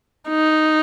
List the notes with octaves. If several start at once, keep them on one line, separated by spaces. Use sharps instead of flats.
D#4